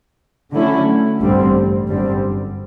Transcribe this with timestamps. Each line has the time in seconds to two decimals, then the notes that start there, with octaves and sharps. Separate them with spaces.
0.53 D3 F#3 A3 C#4 E4
1.20 A1 G2 D3 G3 C4
1.87 G1 F#2 D3 G3 C4